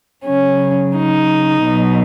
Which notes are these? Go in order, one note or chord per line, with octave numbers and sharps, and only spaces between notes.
C#3 F#3 C#4
D#4
B2 F#3